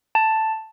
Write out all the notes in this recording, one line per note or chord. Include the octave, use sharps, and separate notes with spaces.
A5